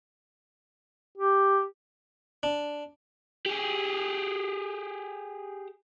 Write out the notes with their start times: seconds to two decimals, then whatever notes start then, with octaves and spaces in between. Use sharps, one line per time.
1.17 G4
2.43 D4
3.46 G4 G#4